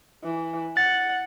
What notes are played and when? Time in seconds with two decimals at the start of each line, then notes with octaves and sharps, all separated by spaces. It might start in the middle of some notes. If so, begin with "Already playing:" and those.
0.24 E3
0.77 F#5 A6